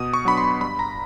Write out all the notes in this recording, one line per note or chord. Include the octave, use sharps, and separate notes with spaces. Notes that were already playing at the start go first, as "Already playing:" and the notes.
Already playing: B2 D#6
C#6
F#3 B3 D4 B5
C6
G2 B5
A#5